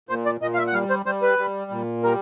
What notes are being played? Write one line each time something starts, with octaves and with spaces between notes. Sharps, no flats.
A#2 C5
D5
A#2 D#5
F5
E5
F#5
G3 F5
C5
G3 C5
B4
G3
A#2
G3 A#4